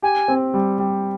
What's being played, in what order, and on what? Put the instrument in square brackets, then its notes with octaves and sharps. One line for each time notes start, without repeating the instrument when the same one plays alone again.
[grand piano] G4 [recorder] G#5
[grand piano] C4
G3
G3